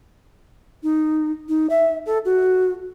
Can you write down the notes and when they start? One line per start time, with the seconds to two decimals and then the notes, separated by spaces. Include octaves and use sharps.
0.83 D#4
1.48 D#4
1.69 E5
2.05 A4
2.25 F#4